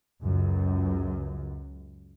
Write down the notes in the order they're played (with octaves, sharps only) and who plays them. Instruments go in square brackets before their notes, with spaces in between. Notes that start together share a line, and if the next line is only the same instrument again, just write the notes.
[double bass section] C#2 F#2